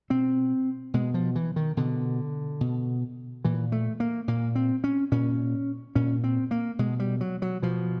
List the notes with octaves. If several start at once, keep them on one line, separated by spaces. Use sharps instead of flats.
B2 C4
B2 G#3
F3
E3
D#3
B2 D3
B2
A#2 E3
A3
A#3
A#2 A#3
C4
C#4
A#2 C#4
A#2 C#4
C4
A#3
B2 G#3
G3
F#3
F#3
B2 F3